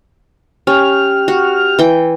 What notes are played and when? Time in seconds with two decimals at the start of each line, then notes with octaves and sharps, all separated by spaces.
0.67 C#4 G4 F6
1.28 F#4
1.79 E3 G5